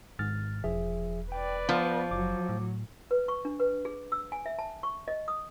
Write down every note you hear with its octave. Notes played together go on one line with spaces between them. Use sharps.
G#1 G#2 F6 A6
E1 F3 G#4 E5
B4 D5 G5
F3 B3
F#1 F#3 D6
A2
B4
C#6
D4
B4
G#4
E6
G#5
E5
A5
C#6
D#5
D#6